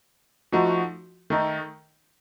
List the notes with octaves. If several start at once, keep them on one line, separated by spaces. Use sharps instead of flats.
F3 A3 D#4 F#4
D#3 A3 D#4